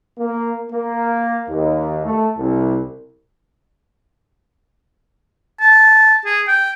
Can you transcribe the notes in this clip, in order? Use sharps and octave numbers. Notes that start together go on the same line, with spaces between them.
A#3
A#3
D#2
A3
C2
A5
G#4
G5